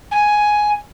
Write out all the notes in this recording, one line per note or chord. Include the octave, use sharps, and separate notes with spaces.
G#5